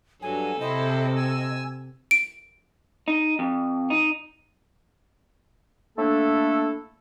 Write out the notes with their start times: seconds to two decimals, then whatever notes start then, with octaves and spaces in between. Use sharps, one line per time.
0.22 G2 F#3 A4 G#5
0.61 C3 C4 E4 C5 D#5
1.16 G#5 E6
2.11 D7
3.08 D#4
3.39 F2
3.90 D#4
5.98 A3 A#3 D4 E4 A4